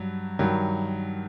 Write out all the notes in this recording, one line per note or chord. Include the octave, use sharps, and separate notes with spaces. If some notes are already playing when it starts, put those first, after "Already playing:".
Already playing: G2 F#3
G2 D#3 F#3